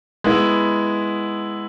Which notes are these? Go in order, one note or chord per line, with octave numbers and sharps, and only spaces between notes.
G#3 B3 E4